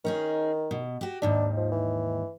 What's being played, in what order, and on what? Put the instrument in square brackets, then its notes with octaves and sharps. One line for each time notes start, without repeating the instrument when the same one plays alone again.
[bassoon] D#3 [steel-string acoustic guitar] C#4 D#4 G#4
[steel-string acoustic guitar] B2
F#4 G4
[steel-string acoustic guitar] D#2 G#2 D#3 [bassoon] D4
[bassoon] F3
E3